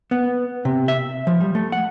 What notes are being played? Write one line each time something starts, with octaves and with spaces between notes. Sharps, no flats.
B3
C3
E5
F3
G3
A3
F#5